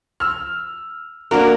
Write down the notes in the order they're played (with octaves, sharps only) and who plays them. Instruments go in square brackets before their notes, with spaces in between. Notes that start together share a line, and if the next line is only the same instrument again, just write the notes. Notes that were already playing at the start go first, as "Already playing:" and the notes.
[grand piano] E6 F6
[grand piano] A#3 D4 F#4 [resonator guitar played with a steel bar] A#4